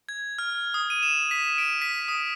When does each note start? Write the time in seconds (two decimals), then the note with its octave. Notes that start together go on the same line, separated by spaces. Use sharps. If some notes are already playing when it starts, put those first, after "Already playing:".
0.09 G#6
0.39 F6
0.74 D#6
0.90 D#7
1.03 E7
1.31 B6
1.58 D7
1.82 B6
2.08 D#6